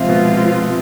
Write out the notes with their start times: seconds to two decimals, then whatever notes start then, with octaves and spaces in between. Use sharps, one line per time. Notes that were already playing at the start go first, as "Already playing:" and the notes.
Already playing: C3 F3 G#3 C4 F4
0.08 B2